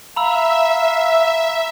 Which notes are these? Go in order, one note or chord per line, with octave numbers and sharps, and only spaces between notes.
E5 F5 A#5 B5 E6